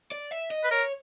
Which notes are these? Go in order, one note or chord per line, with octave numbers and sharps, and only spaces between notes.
D5
E5
D#5
B4
A#4 C#5